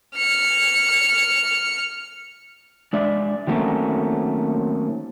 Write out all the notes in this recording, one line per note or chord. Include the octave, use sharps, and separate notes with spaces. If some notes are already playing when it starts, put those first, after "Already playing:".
F6 C#7
G#3 D4 D5 E5
D#3 F#3 A3 A#3 C4 C#4